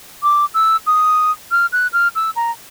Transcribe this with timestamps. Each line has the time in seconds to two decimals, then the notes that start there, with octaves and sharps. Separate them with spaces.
0.23 D6
0.54 E6
0.87 D#6
1.51 F6
1.72 F#6
1.93 F6
2.15 E6
2.36 A#5